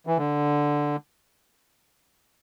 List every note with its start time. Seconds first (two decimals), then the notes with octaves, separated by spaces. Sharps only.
0.07 E3
0.18 D3